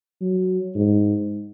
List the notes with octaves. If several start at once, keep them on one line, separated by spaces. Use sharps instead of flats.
F#3
G#2